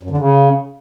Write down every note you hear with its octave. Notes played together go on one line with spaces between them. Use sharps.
F#2
D3
C#3